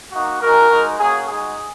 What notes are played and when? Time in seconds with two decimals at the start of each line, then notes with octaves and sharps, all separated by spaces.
0.12 A#3 D#4 F#4
0.40 G#3 D#4 F#4 A#4
0.70 G#3 D#4 F#4
0.98 A#3 C#4 F#4 G#4
1.28 G#3 D#4 F#4 G#4